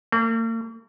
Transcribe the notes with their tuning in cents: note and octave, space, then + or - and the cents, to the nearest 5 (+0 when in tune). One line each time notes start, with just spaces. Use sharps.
A#3 -45